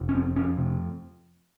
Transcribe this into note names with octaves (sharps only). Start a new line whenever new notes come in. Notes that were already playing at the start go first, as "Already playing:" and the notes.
Already playing: F1
C#4
F2 C4
F2 C#4
C3